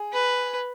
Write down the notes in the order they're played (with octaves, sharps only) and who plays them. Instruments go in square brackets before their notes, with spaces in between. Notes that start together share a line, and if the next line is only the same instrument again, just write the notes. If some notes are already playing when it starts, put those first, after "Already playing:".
Already playing: [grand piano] G#4
[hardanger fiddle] B4